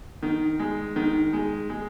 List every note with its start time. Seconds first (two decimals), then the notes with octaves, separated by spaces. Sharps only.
0.23 D#3
0.59 G#3
0.96 D#3
1.33 G#3
1.70 G#3